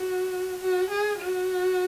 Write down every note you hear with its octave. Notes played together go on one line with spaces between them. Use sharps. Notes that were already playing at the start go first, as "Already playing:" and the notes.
Already playing: F#4
F#4
G#4
F#4